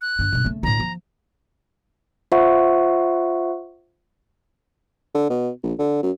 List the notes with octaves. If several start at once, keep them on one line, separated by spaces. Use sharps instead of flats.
F#6
G2 D3
G2 B2
C#3 A3
D2 A2 A#5
F3
F4 C5 E5 F#5 C#6
D3
B2
A#1
D3
F#2